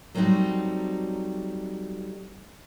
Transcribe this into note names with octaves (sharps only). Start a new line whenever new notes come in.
F#3 G3 A3 C4 D#4 F#4